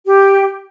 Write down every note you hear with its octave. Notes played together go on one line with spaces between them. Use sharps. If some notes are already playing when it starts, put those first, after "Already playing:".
G4